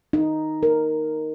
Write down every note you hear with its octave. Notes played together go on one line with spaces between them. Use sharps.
D#4
A#4